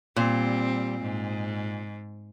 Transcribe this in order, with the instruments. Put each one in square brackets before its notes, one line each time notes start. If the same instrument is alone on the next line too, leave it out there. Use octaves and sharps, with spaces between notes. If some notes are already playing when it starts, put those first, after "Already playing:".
[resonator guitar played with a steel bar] A#2 [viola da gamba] G3 C4
[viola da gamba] G#2